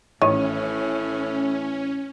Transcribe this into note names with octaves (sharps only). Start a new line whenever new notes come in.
A1 A2 D#3 C#4 C#5 D#7